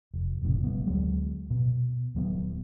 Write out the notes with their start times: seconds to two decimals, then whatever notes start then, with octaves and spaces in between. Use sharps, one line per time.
0.14 F1
0.42 F1 A#1 A2 C#3
0.64 G3 B3
0.87 D2 F#3 G#3
1.50 B2
2.15 D#1 F#3 B3